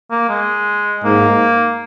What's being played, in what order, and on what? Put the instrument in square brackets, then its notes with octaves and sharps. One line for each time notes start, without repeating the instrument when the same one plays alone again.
[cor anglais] A#3
G#3
[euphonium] G#2 [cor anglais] A#3